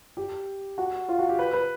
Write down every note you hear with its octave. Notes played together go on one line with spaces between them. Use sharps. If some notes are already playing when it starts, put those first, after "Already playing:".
G4
F#4
F4
F#4
G4
B4
B4